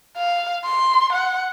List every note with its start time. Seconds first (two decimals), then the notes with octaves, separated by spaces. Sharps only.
0.17 F5
0.64 C6
1.12 F#5